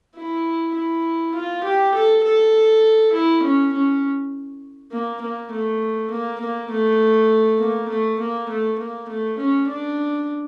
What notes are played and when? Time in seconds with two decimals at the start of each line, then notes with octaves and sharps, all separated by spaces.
0.15 E4
0.75 E4
1.34 F4
1.64 G4
1.94 A4
2.24 A4
3.13 E4
3.43 C#4
3.73 C#4
4.91 A#3
5.21 A#3
5.51 A3
6.11 A#3
6.40 A#3
6.70 A3
7.59 A#3
7.89 A3
8.19 A#3
8.49 A3
8.78 A#3
9.08 A3
9.38 C#4
9.68 D4